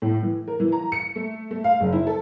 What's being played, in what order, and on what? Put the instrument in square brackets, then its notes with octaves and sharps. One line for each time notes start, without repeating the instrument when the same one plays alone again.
[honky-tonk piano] A2
E3
A#4
E3
A#5
C#7
A3
A3
F5
F#1
E4
A4